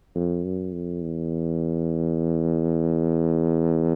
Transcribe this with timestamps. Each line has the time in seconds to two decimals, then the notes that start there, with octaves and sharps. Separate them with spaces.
0.15 F2
0.44 F#2
0.72 F2
1.02 E2